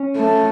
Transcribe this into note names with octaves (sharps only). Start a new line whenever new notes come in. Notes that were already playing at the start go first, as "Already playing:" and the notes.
Already playing: C#4
A3